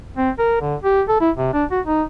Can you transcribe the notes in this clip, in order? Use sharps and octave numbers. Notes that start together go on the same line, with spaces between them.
C4
A#4
D3
G4
A4
E4
C3
D4
F#4
D#4